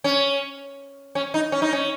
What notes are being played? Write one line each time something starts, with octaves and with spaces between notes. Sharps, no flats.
C#4
C#4
D#4
C#4
D#4
C#4